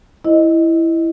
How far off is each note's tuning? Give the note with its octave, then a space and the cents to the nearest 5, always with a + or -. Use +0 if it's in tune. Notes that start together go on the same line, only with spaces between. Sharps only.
E4 +0 C5 +30 D#5 +0